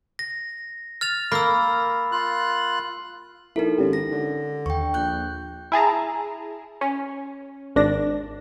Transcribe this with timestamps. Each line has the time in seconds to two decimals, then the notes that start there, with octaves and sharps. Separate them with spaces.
0.19 A#6
1.01 F6 A6 F7
1.32 A#3 B5 E6
2.12 F4 F#6
3.56 A#1 D#4 E4 A4 A#4
3.78 G#1 C#4 G4
3.93 A#6
4.12 D3
4.66 D#2 G5 C#6
4.94 A#1 F#6 G6
5.72 E4 G#4 A5 A#5
6.81 C#4
7.76 G#1 D4 A#6